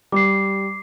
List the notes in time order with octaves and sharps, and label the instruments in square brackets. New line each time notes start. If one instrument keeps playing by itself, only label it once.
[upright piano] G3 [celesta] D6 C7